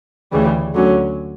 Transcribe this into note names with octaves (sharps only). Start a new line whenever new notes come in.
D2 C#3 E3 G3
D2 D3 F#3 C#4